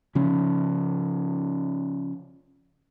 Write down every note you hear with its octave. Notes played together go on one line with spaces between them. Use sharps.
C#3 F3 C#4